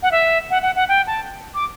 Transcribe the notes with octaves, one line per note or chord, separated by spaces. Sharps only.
F#5
E5
F#5
F#5
F#5
G5
A5
D6